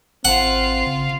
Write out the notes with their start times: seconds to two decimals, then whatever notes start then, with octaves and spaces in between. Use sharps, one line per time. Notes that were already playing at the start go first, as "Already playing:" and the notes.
0.25 G#1 C4 F4 F5 F#5
0.87 C#3